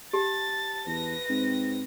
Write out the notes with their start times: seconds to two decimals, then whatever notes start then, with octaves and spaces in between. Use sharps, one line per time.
0.13 G4 A5 A6
0.87 E2 B4 A#6
1.29 G#2 C4